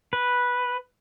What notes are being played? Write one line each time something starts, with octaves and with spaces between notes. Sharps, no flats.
B4